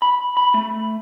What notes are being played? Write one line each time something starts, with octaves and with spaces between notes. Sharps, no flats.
B5
B5
A3